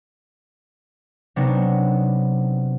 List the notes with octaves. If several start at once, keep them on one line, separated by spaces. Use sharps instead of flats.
C3 F#3 B3 D4 D#4